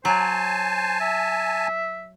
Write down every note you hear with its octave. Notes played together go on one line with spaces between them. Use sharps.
F#3 C5 G#5 A5
E5